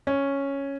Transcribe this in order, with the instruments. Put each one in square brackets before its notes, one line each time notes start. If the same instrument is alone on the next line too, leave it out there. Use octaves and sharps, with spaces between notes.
[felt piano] C#4